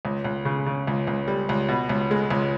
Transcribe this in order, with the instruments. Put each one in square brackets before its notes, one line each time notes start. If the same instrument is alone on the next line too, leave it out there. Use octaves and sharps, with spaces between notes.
[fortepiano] C#2
C#2
C#3
C#3
C#2
C#2
G3
C#2
B2
C#2
G#3
C#2